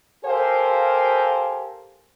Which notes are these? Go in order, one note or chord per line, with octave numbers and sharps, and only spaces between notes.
G4 A4 A#4 C5 F5 G#5